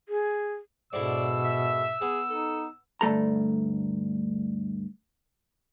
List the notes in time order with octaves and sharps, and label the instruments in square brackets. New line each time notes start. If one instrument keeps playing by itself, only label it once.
[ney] G#4
[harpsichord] G#2 D3 E4 [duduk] B2 [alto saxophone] D5 [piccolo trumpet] E6
[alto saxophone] E5
[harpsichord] B3 [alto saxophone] G#4
[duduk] D#4 [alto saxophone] A4
[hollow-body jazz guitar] D2 G2 A3 A4 A#5